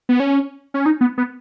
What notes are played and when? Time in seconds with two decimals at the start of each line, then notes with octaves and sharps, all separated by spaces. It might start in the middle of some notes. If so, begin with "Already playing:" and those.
0.09 B3
0.20 C#4
0.74 C#4
0.86 D#4
1.01 B3
1.18 B3